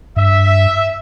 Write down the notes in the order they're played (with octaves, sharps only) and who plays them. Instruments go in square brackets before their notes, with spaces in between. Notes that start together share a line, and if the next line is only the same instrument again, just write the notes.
[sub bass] G2 [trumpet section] E5